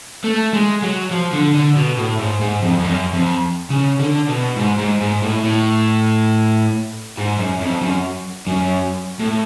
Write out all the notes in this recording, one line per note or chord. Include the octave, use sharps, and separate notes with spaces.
A3
G#3
F#3
F3
D3
D3
B2
A2
G#2
G#2
F2
F2
F#2
F2
C#3
D3
B2
G#2
G#2
G#2
A2
A2
G#2
F#2
F2
F#2
F#2
A2